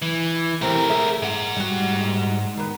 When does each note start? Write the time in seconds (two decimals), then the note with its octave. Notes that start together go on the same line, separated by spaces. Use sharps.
0.02 E3
0.61 E3 A3 C4 G4 A#4
0.90 G#4 E5
1.22 G#2 F#5
1.57 G3 F#4
2.57 D#3 B3